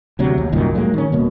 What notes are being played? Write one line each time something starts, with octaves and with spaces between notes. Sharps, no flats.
D2 C3 F#3
D#2
C2 F#2 A#2 D#3
A2 F#3 G#3 A#3
D#3 C#4
D#1 B2 A#3